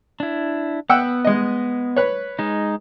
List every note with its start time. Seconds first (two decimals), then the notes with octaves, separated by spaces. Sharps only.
0.20 D4 E4
0.90 B3 F#5 G5 E6
1.25 G#3 D#5
1.96 B4 C#5
2.39 G#3 D#4